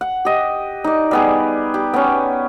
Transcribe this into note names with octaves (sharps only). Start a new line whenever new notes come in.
F#5
G4 D#5
D#4 D5
G3 B3 G#4
G4
B3 C#4